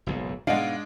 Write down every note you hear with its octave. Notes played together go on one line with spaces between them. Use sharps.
F#1 B1 G#2
G#2 B2 G#3 D4 F5 F#5